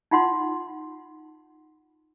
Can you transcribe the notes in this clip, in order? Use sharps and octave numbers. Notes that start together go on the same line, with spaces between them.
D#4 F4 F#5 C6